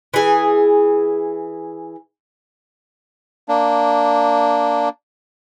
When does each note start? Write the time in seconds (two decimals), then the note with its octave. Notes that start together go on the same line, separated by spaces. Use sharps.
0.14 E3 G#4
3.48 A#3 D4